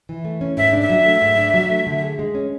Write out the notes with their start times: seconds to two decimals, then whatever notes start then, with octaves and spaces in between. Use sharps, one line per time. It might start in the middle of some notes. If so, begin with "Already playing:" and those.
0.09 E3
0.25 A3
0.41 C#4
0.57 G#2 E5
0.73 D4
0.81 E5
0.90 F#3
1.05 A3
1.22 G#2
1.38 D4
1.54 F#3
1.70 A3
1.87 D3
2.03 G#4
2.19 G#3
2.35 C#4